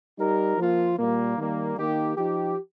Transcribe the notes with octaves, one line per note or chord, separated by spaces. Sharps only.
G3 D#4 G4 A#4
F3 A#3 F4
A#2 G3 A#3
D#3 G3 A#3
D#3 A#3 D#4 G4
F3 D#4 G4